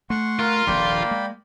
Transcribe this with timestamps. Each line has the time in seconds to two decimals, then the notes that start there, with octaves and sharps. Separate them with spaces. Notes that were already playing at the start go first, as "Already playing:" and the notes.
0.10 A3 F#5 C6 C#6
0.39 F4 A#4
0.67 D#1 A#1 C3 A#3 D5 G5 B5
1.11 G#3